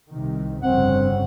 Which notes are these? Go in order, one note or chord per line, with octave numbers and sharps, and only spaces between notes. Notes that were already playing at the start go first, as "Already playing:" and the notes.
C2 C3 D#3
G1 F2 C#3 C4 F#5